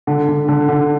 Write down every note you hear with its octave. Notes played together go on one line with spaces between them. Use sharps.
D3
D3
D3
D3